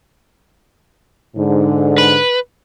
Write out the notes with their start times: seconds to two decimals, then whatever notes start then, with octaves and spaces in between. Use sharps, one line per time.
1.36 G#2 D3
1.98 B4